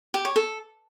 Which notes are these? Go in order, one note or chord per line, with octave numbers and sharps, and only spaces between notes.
G4
C#5
A4